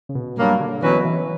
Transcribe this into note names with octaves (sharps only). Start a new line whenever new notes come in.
C#3
B2
G2 F#3 A#3
D3
B2 E3 F#3 C#4 F#4 B4
E3